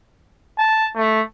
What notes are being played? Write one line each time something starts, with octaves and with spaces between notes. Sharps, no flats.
A5
A3